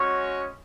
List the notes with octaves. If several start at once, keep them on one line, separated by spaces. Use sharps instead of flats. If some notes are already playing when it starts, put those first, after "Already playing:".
Already playing: G#3 C#4 F#4 C#5